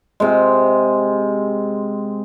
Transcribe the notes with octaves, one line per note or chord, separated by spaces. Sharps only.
C3 G#3